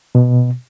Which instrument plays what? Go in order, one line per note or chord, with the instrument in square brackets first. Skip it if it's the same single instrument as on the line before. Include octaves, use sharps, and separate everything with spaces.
[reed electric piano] B2